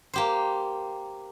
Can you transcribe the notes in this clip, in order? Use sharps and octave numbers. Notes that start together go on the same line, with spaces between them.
A#3 G4 C5